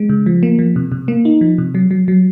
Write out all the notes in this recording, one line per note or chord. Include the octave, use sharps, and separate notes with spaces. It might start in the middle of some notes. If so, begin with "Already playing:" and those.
Already playing: G#3
C#3
F3
A#3
F3
C3
C3
A#3
D#4
F3
C3
F#3
F#3
F#3